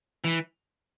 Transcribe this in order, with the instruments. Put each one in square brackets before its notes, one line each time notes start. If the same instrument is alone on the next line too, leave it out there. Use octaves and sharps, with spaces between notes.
[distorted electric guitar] E3